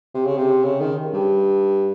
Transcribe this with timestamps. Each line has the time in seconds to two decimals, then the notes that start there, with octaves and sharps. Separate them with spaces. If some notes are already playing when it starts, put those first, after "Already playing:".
0.14 C3
0.26 C#3
0.38 C3
0.64 C#3
0.80 D#3
1.13 G2